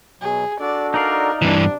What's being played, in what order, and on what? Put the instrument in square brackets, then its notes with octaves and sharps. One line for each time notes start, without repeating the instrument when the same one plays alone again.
[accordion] B2 F#3 [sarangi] G#4
[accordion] D4 F#4 A4 [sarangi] D5
[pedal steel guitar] D#4 D5 F5 [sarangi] A#4
[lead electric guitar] G2 E3 [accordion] C3 [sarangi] D4